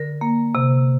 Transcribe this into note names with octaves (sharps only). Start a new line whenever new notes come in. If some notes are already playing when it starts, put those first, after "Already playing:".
Already playing: D3 A#4
A#3
C3